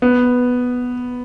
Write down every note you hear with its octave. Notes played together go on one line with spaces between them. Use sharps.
B3